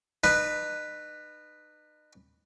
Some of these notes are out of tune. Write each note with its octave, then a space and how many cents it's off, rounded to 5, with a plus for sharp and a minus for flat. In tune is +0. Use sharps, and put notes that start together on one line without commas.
D#4 -35 B4 +0